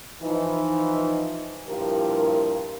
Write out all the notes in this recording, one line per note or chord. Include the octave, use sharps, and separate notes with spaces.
E3 F3 D#4
G2 A#2 F3 E4 G4 A#4